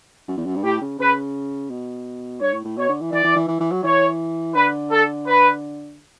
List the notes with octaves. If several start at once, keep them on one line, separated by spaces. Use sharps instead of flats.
F#2
E2
F#2
G2
A2 G4
C#3
C#3 B4
B2
G2 C#5
A2
A2
B2 C#5
D3
E3
E3 D5
E3
E3
E3
E3
F#3
E3 C#5
D3 B4
A4
B4